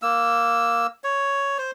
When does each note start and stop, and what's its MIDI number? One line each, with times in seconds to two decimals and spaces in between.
0.02 0.87 58
0.02 0.87 88
1.04 1.58 73
1.58 1.71 72